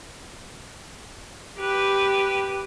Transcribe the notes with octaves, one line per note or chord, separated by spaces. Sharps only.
G4 B4